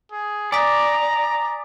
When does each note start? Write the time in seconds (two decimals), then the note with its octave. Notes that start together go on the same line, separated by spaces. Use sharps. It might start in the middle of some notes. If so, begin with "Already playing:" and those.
0.12 G#4
0.52 D5 G#5 A#5 D#6 B6